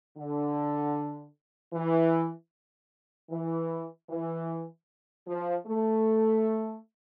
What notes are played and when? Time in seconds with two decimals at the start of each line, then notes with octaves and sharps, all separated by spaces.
0.17 D3
1.74 E3
3.31 E3
4.10 E3
5.27 F3
5.66 A3